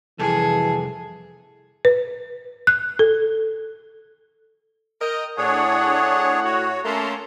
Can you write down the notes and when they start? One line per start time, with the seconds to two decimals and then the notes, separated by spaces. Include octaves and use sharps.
0.19 C2 F2 E3 G#4 A4
1.85 B4
2.67 F#6
2.99 A4
5.00 A#4 D#5 G5
5.37 A2 D4 G#4 C#5 F#5
6.44 F#4 C#5
6.84 A3 A#3 C#4 A5 A#5 C6